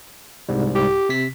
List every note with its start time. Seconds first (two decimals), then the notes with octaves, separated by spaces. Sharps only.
0.49 C2 G#2 G3
0.75 G4
1.09 C3 B6